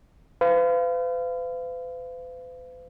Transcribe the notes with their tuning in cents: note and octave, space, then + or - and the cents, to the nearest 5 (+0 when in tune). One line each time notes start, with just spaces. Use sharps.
B4 +45 F5 -20